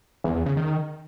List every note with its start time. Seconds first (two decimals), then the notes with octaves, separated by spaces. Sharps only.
0.24 E2
0.35 E2
0.46 C#3
0.57 D#3